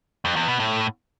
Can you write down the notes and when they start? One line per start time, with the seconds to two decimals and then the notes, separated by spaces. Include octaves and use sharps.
0.25 F2
0.36 E2
0.48 B2
0.60 A2